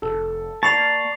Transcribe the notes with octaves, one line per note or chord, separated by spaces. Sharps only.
F1 A4
A#3 D5 A5 B5 C#6 C7 F7